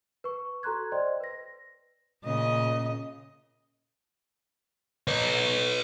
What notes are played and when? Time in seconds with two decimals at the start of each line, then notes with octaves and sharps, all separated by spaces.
0.24 B4 C#6
0.63 F#4 A4 A#5 C6 F#6 G#6
0.92 C5 D5 D#5 G5 C6
1.20 B4 A#6
2.24 A#2 C#3 D#5
5.08 B4 C#5